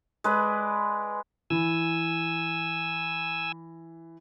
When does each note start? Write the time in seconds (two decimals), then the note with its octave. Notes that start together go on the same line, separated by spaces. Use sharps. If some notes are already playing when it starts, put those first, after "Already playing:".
0.24 G#3 B4 D5
1.50 E3 G#5 E6